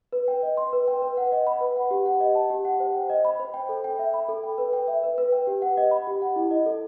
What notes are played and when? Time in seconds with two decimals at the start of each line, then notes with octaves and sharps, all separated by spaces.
0.12 B4
0.28 G5
0.43 D#5
0.57 C6
0.73 B4
0.88 G5
1.02 B4
1.17 F#5
1.32 D#5
1.47 B5
1.61 B4
1.76 F#5
1.91 G4
2.06 F#5
2.20 D#5
2.35 A5
2.50 G4
2.65 F#5
2.80 C5
2.95 G5
3.10 D#5
3.25 B5
3.40 C5
3.54 G5
3.69 A4
3.84 G5
3.99 E5
4.14 B5
4.29 A4
4.43 G5
4.58 B4
4.73 G5
4.88 E5
5.03 B4
5.18 B4
5.32 G5
5.47 G4
5.62 F#5
5.77 D#5
5.91 B5
6.07 G4
6.22 F#5
6.36 E4
6.51 D#5
6.66 A4